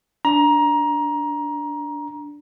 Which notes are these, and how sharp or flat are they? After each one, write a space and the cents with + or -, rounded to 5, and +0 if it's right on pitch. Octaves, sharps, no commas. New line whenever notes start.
D4 -10 A#5 +20